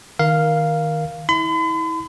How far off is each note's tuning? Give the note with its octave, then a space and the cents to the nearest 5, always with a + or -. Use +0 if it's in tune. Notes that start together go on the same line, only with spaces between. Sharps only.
D#3 +0 A#4 +15 F5 -5
E4 -30 B5 +45